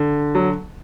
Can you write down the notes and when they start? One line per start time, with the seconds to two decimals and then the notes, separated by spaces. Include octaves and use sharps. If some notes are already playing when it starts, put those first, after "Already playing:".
Already playing: D3
0.35 F#3